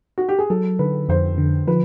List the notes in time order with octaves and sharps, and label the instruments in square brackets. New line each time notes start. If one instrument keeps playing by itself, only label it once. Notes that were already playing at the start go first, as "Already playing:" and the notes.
[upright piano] F#4
G4
G#4
[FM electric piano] F#3 [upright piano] A4
[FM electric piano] D3 [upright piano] B4
[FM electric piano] F2 [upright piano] C5
[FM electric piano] D3
[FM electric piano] F3 [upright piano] B4